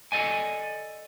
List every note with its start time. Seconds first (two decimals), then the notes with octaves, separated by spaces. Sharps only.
0.12 A4 D5 D#5 G#5